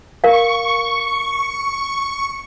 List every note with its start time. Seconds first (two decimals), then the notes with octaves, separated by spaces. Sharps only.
0.24 A#4 F5 C#6